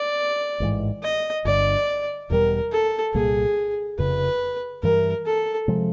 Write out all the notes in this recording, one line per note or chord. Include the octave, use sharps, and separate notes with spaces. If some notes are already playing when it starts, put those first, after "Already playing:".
Already playing: D5
A1 G#2 E3
D#5
G1 G2 D3 D5
E1 E2 B2 G3 A#4
A4
C2 A#2 G3 A#3 G#4
F1 F2 C#3 B4
G2 E3 G3 A#4
A4
C3 F3 G#3